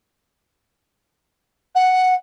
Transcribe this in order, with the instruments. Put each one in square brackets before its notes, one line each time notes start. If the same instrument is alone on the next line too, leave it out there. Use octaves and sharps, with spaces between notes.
[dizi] F#5